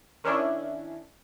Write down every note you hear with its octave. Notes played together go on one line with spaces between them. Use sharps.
D#3 C#4 D4 E4